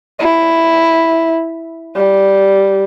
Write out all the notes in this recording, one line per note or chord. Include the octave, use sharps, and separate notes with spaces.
E4
G3